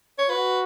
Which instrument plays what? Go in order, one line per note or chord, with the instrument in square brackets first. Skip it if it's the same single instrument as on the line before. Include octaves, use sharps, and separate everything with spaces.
[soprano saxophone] C#5
[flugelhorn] F#4 [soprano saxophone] B4